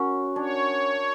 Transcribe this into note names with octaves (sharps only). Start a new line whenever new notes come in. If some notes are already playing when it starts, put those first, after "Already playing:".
Already playing: C#4 F#4 A#4
D4 C#5